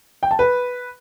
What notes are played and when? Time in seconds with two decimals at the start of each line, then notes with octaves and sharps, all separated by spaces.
0.23 G5
0.31 A5
0.39 B4